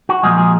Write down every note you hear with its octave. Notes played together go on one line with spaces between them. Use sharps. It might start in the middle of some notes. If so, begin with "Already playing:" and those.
F#4
A#2 F3 G#3 G#4
G#4